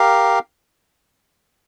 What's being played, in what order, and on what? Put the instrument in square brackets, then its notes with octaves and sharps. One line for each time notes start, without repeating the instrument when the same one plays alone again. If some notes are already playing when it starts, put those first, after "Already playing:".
Already playing: [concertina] G4 A#4 F5